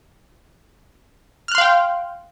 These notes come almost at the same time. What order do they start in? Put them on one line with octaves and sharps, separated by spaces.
F6 F#6 C6 F5 G5